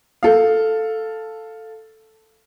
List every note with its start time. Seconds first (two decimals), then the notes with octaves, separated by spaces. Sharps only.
0.23 A4 F5